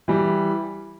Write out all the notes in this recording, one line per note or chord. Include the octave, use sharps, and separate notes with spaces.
E3 G3